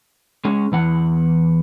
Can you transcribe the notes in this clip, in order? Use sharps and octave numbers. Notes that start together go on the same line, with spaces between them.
G#3 C#4
E2 E3 F#5